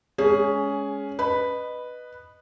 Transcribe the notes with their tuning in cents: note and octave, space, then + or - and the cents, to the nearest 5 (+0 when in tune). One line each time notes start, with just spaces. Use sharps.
G#3 +0 C#4 +15 G#4 +5
B4 +0 D#5 -15